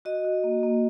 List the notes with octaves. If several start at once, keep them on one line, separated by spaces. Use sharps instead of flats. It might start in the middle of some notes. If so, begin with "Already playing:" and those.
F#4 D#5
F#4
A#3
A#3